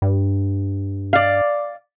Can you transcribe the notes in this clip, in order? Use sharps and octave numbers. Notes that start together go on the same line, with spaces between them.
G2
D5 F5